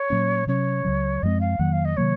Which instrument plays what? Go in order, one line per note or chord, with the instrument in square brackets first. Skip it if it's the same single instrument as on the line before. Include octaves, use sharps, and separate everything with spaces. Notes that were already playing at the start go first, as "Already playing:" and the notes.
Already playing: [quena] C#5
[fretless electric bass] A#2 F#3 A#3 C#4
[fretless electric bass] C3 F#3 C#4 [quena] C#5
[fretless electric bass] C#2 C#3 F#3
[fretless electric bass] F#2 F3 G#3 C4 [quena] D#5
[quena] F5
[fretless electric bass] F2 D#3 F#3 A#3 [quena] F#5
[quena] F5
D#5
[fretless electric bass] C3 D#3 F#3 A#3 [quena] C#5